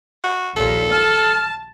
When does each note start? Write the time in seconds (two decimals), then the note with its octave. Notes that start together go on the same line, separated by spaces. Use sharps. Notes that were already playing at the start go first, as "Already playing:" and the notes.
0.24 F#4
0.56 A#1 D#2 A#2 A4
0.91 A5 F6